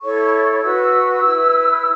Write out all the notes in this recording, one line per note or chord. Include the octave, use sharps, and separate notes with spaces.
E4 A4 C#5 C#6
F#4 B4 E6
E4 B4